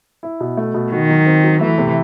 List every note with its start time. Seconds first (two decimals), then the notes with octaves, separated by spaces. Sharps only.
0.23 E4
0.41 B2
0.57 A3
0.74 B2
0.92 D#3 F#4
1.10 F#3
1.26 C4
1.44 F#3
1.61 E3 A3
1.78 C3